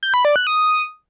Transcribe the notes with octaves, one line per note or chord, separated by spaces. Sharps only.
G6
B5
D5
F#6
D#6